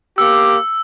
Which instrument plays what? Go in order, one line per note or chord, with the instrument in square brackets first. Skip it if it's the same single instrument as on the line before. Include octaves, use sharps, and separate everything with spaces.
[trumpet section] A#3 G4 D6 [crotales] E6